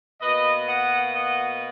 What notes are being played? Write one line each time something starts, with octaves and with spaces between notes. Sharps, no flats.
B2 A#3 B4 D#5
D#5 F#5
D#5 F#5